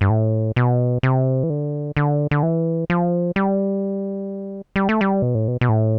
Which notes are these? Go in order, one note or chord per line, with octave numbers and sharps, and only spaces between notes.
G2
A2
B2
C3
E3
D3
D3
D3
E3
F3
G3
G3
A3
G3
B2
A2
B2
B2
A2